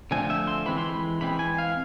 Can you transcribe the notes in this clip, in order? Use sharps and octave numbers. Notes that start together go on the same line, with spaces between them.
D3 F3 A3 C4 G#5
E5
C6
E3 G#3 C4 B5
C6
B5
E3 G#3 C4 B5
G#5
F5